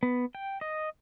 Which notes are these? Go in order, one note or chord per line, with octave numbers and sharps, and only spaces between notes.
B3
G5
D#5